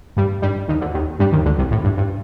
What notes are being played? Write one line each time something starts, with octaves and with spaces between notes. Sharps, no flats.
G2 G3
G2 G3
D#2 D#3
D2 D3
D#2 D#3
G2 G3
D#2 D#3
D2 D3
C2 C3
A2
G2
G2